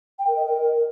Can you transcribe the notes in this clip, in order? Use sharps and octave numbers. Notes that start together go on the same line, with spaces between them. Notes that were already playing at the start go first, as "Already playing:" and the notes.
G5
A#4
D#5
A#4